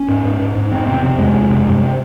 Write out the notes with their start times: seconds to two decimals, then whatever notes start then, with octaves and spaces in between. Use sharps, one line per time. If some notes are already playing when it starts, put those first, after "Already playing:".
Already playing: C#4
0.08 G#2
0.24 G#2
0.39 G#2
0.55 G#2
0.71 F2 C4
0.87 C3 C4
1.03 C3 C4
1.18 F2 G#3
1.34 F2
1.50 C3
1.66 G2